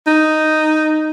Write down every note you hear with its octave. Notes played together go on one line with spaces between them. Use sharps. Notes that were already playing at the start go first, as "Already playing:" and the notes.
D#4